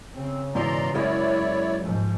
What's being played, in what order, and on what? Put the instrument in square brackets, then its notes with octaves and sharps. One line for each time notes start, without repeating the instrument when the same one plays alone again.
[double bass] C#3 [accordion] C4
[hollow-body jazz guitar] G#2 B2 E3 [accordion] D5 A#5 C6
[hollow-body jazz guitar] F#2 G#3 A#3 [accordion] E4 C#5 D5
[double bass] G#2 F3